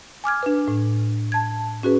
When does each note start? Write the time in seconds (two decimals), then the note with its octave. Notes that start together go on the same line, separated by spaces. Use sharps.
0.24 G#5 D6 F6 G#6
0.43 D4 B4
0.68 A2
1.32 A5 G#6
1.83 C#4 F#4 G#4 B4